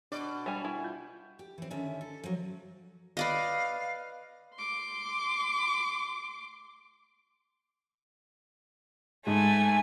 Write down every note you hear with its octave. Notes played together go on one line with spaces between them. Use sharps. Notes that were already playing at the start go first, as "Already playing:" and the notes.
B2 D4 D5
G3 G#5
E4
F4 G6
G4
E3 C4
D3 D#3 C#4 E5
A4
F3 F#3
B4 D5 D#5 F5
C6 D6
G#2 A3 G#5